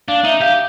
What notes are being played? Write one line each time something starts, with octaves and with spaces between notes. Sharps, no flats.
D4 F5
D#4 E5
G4 F5